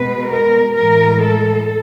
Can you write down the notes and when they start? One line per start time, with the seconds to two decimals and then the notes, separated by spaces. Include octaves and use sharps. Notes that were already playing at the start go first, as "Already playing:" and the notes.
Already playing: B2 G#3 B4
0.28 A#4
0.75 A2 E3 G#3 A#4
1.22 A4